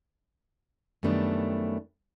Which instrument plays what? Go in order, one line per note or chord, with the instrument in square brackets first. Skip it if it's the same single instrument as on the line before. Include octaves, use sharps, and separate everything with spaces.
[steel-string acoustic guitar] F#2 D#3 G3 A3 B3 D4